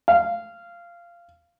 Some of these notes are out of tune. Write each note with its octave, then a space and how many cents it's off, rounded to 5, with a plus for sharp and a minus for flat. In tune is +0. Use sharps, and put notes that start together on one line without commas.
F5 -15